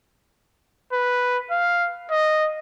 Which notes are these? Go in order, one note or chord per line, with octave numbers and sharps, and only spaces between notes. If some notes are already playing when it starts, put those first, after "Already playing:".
B4
F5
D#5